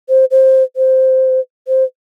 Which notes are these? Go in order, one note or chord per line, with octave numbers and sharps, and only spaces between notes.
C5
C5
C5
C5